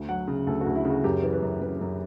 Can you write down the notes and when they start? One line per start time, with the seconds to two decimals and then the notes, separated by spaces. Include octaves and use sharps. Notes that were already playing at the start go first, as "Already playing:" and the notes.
Already playing: D2
0.09 F#3 F#5
0.28 C#3
0.47 D2 A4
0.61 F#4
0.66 D2
0.75 E4
0.85 C#3
0.90 F#4
1.04 F#2 G4
1.23 E3
1.33 B4
1.42 F#2
1.62 F#2 B4
1.81 F#2